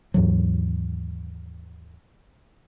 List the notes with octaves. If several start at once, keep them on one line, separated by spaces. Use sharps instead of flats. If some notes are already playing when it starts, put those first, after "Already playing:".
D#2 G#2 E3 F#3